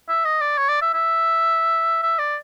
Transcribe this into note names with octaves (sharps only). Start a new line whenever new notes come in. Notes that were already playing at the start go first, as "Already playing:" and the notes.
E5
D#5
D5
C#5
D5
E5
E5
E5
D5